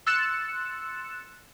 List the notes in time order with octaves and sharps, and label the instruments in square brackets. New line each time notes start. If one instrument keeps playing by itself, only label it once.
[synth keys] C6 E6 F#6 A6 C#7 E7